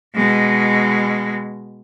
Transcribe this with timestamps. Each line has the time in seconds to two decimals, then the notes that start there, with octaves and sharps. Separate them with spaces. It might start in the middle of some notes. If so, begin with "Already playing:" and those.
0.15 B2 G#3